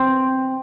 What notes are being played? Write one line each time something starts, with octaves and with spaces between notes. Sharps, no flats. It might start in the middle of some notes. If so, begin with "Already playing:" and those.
Already playing: C4